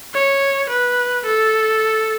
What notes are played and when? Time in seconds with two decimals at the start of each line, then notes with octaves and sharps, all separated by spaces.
0.15 C#5
0.71 B4
1.26 A4